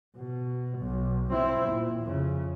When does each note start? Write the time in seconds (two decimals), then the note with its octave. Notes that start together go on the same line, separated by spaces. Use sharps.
0.16 B2
0.79 B1
1.32 C4 E4
1.70 A#2
2.01 F2 C#3